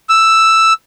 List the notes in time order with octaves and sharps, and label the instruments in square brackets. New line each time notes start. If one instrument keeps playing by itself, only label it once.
[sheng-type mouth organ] E6